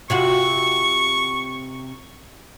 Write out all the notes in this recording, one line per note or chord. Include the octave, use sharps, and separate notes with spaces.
C3 F4 F#4 C#6